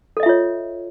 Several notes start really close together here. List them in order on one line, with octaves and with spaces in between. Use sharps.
A4 D#5 E5 F4 C#5